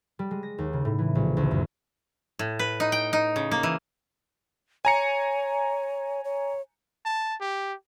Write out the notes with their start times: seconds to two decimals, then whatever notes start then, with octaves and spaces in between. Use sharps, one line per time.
0.19 G3
0.31 G#3
0.43 A#6
0.58 D#2
0.73 C#3
0.85 A2
0.98 E3
1.15 A#1
1.37 D2
1.51 F#2
2.39 A2
2.59 B4
2.80 D#4
2.92 G5
3.13 D#4
3.36 C#3
3.51 A#3
3.63 E3
4.85 C#5 G#5 A#5 C#7
6.24 C#5
7.06 A5
7.41 G4